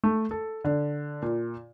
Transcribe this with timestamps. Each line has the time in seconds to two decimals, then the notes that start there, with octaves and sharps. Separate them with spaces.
0.04 A3
0.31 A4
0.65 D3
1.22 A#2